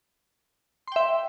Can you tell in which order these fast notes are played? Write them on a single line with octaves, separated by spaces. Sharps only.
C6 G5 E5